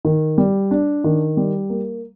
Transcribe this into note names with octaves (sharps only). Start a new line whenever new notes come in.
D#3
G3
D4
D#3
G3
A#3